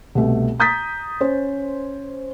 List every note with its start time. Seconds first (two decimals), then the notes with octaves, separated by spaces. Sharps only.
0.15 C2 B2 A3
0.60 A#5 D#6 G6 A6 B6
1.21 C#4 C5